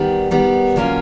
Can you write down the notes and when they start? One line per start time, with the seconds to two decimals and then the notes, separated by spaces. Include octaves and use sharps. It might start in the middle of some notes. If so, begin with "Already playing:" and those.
Already playing: D#3 G3 B3
0.31 D#3 G3 B3
0.76 D3 F#3 A#3 C#4 F4